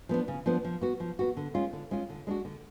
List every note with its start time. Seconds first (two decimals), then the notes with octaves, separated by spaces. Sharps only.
0.09 F3 B3 D4
0.28 C#3
0.46 F3 B3 D4
0.64 F3
0.81 B3 F#4
1.00 F3
1.19 B3 F#4
1.37 D3
1.54 G#3 C#4 F4
1.73 D3
1.91 G#3 C#4 F4
2.10 D3
2.27 G#3 D4 F#4
2.45 D3